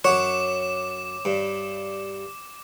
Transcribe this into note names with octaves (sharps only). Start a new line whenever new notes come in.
F#2 C#5 F#5 D6 E7
G2